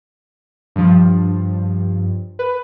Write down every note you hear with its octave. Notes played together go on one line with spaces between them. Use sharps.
G2 F3
B4